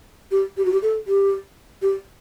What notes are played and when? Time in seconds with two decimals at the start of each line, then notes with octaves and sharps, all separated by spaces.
0.31 G4
0.57 G4
0.65 F#4
0.72 G4
0.82 A4
1.07 G4
1.82 G4